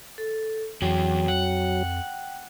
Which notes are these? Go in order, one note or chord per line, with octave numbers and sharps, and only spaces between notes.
A4
F2 E3 F#3 G#4 G5
F#5